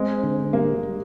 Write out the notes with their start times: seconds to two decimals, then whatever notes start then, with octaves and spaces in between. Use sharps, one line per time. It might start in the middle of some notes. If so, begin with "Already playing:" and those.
Already playing: G#3 C4
0.23 D3
0.53 G3 A#3
0.83 G3